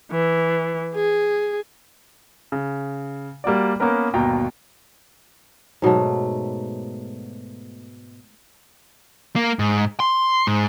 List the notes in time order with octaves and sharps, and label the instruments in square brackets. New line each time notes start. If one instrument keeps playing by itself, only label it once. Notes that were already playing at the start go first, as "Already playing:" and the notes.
[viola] E3
G#4
[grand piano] C#3
G3 A#3 F#4 D5
A#3 B3 C#4 A#4 B4
G1 D#2 B2 G5 A#5
[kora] G#2 B2 F#3 A3
[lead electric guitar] A#3
G#2
C6
G#2